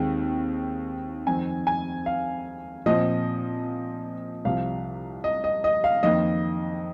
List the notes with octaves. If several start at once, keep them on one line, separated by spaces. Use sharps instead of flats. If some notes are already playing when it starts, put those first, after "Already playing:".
Already playing: D#2 D#3 G#3 C4
F2 D#3 C4 G#5
G#5
F5
A#2 F3 C4 D#5
C2 C3 F3 F5
D#5
D#5
D#5
F5
F2 D#3 A#3 D#5